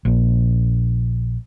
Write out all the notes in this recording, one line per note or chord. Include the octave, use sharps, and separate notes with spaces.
A#1